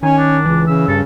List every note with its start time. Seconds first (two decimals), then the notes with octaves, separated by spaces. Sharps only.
0.03 D#3 C#4 G#5
0.18 D4
0.45 C#2 E3
0.67 C#3 E6
0.88 G2 A4